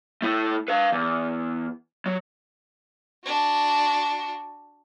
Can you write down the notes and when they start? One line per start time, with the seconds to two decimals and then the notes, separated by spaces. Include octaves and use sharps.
0.22 A3 E4
0.68 B4 F5
0.92 E2
2.06 F#3
3.25 D4 F#4